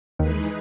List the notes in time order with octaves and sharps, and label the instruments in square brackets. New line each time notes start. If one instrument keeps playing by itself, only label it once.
[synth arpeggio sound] D#2 D#3 [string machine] E3 G#3 D#4 G#4 B4